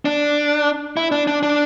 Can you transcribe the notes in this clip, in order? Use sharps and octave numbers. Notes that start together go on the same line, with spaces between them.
D4
E4
D4
D4
D4